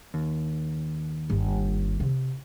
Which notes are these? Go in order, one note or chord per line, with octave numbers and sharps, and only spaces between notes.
D#2
G1
C3